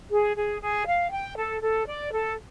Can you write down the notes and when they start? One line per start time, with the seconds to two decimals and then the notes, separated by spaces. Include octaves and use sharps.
0.11 G#4
0.36 G#4
0.61 G#4
0.86 F5
1.11 G5
1.37 A4
1.62 A4
1.87 D5
2.13 A4